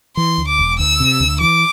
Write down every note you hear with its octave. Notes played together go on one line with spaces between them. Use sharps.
E3 C6
D2
D6
E1
D2 E6
C3
D2
E3 D6